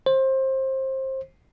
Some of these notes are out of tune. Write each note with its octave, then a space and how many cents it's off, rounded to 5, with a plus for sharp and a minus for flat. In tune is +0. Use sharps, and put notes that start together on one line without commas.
C5 +25